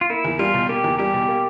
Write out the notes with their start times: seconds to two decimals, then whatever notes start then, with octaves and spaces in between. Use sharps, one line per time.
0.01 F4
0.10 A#3 E4
0.24 E2
0.39 G3 F4
0.54 B2
0.69 A#3 G4
0.84 E2
0.99 G3 G4
1.14 B2
1.28 A#3